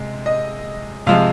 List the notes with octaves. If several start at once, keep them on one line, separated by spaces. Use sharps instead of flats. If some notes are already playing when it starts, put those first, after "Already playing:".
Already playing: C3 G#3
D#5
C3 F3 G#3 F5